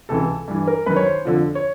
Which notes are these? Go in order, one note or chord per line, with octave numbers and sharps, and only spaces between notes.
C#2 C3 E3 A4
G2 E3
A#4
F#2 D#3 B4
C#5
C5
F2 D3 F3
C#5